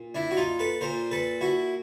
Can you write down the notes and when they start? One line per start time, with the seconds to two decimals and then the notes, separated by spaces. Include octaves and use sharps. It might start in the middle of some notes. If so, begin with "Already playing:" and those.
Already playing: A#2
0.15 D4 E4
0.31 F#4
0.37 D#4 F4
0.59 A4 B4
0.81 A#2 A#4 C5
1.11 A4 B4
1.41 E4 F#4